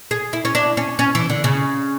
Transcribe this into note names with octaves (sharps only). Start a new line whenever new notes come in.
G#4
E4
C#4
D4
C#4
C#4
E3
D3
C#3